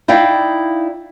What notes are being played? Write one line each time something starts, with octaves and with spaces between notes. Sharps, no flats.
D#4 E4 D5 F5 G5